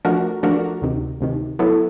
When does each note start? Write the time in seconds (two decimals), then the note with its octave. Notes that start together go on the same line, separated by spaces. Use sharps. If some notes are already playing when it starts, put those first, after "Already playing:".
0.05 F3 A3 D4 F#4 A#4
0.43 F3 A3 D4 F#4 A#4
0.82 D2 C3 D#3
1.21 D2 C3 D#3
1.59 F#3 B3 E4 A4